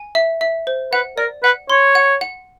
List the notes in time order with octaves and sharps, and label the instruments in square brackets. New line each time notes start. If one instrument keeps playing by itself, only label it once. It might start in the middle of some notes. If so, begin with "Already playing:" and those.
Already playing: [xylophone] G#5
E5
E5
C5
[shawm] B4 [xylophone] F#5
[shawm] A#4 [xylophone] D5
[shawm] B4 [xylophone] F#5
[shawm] C#5 [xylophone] C6
[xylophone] F#5
F#5